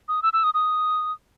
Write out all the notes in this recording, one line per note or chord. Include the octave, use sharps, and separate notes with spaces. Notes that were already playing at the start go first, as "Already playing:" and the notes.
D#6
E6
E6
D#6
D#6